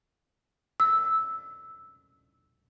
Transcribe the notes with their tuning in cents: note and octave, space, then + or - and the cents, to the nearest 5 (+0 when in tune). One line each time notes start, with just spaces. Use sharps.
E6 -5